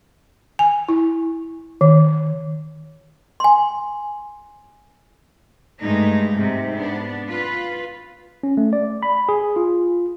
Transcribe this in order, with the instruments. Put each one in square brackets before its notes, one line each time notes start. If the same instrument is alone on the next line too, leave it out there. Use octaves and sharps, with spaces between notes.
[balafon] G#5
E4
D#3
[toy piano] G#5 C6
[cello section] G2 G#3 A3 D#4
G#2 C3
B3 D4
F4 B4
[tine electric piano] C#4
A3
D5
B5
G#4
F4